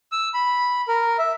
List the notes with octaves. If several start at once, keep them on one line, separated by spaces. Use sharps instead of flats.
E6
B5
A#4
E5